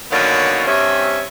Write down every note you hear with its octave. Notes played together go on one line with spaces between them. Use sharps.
D3 D#3 F#3 A#3 B3 C#4
G2 C4 C#4 C#5 E5